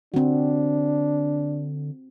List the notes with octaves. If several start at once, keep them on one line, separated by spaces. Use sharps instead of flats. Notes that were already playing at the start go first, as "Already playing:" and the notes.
D3 C4 D4 F#4